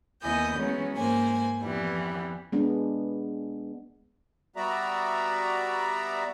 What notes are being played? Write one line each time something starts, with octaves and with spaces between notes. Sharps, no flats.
D#2 B3 E4 D#5 G#5 G6
E3 F#3 G#3 B3 C#4
G#2 E3 A#3 C5 G#5
F2 E3 G3 B3
G#3 B3 D4
G3 B3 F#4 D5 E5 A#5